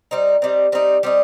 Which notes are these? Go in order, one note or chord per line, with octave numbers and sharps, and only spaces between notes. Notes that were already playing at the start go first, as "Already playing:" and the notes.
G3 C4 D#4
G3 C4 D#4
G3 C4 D#4
G3 C4 D#4